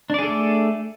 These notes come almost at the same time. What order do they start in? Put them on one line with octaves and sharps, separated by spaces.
D4 D5 G#4 A4 A3